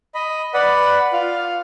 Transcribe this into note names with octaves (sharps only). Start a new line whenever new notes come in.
D#5 B5
B4 D5 F#5 B5
F4 F5